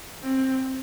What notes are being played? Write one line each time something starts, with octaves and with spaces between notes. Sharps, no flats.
C4